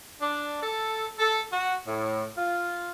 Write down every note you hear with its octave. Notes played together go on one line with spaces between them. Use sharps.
D4
A4
A4
F#4
A2
F4